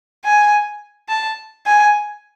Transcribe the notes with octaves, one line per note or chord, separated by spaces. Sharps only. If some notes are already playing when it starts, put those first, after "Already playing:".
G#5
A5
G#5